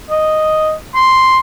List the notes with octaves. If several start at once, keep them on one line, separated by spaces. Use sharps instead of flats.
D#5
C6